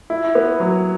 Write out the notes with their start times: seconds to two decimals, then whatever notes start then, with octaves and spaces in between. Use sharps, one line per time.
0.10 E4
0.35 B3
0.60 F#3